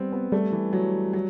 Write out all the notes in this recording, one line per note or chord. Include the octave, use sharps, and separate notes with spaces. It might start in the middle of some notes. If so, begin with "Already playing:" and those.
Already playing: G3 B3 C4
B3
G3 A3
E3
F#3
F#3